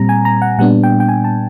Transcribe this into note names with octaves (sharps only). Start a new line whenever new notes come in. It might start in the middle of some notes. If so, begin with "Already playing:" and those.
Already playing: A#2 G3 C4 A#5
G#5
A#5
F#5
A#2 G3 B3 D4 F#5
G5
G5
G#5
A5